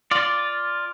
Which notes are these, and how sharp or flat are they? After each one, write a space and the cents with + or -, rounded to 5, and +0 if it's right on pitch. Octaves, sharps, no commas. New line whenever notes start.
F4 +0 D5 +0